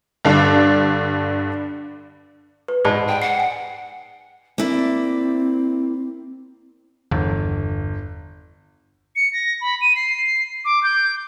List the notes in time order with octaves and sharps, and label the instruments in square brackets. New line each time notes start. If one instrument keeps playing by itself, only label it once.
[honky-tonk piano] G2 D3 D4 D5 F5
[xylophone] B4
[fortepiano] G#2 [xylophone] D5 A5 B5
[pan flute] G5
[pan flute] F#5 [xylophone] C7
[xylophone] G#5
[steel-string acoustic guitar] A#3 E4 D5 [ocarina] C4
[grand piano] G1 [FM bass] E2
[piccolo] C#7
A#6
B5
D#7
C7
D6
G6